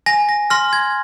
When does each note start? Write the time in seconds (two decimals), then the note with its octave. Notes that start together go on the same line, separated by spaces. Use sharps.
0.06 G#5 A#6
0.29 A#6
0.50 C6 F6 A#6
0.73 G#6